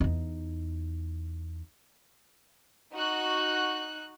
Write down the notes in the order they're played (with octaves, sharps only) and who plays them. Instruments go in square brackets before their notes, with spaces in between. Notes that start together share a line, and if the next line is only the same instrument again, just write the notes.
[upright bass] E2 D#4
[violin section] D#4 F#4 F#6